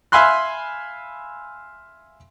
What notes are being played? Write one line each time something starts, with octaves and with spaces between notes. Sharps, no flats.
E5 F5 G#5 B5 C6 F#6